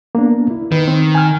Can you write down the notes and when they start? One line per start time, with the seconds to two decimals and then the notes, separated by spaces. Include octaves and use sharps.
0.15 A#3 B3 D4
0.51 E4
0.72 D#3 B4
0.88 C4
1.15 G#5 F6